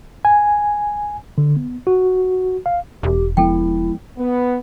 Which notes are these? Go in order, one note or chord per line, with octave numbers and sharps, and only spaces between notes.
G#5
D3
B3
F#4
F5
E1 G4
F3 G#3 B3 E4 A4 G5
B3